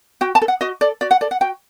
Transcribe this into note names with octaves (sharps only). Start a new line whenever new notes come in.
F#4 G5
A5
A4
F#5
F#4 D#5
A4 D5
F#4 D5
F#5
A4 D5
F#5
F#4 G5